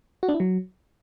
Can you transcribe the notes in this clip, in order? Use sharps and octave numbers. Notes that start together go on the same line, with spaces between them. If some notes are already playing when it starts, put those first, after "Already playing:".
F#4
D4
E4
F#3